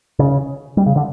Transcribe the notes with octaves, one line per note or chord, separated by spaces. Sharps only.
C#3
G3
C#3
D3